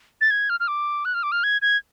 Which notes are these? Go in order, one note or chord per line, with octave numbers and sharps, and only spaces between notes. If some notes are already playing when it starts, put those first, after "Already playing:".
A6
G#6
F6
F6
D6
F#6
F6
D6
F6
G#6
G#6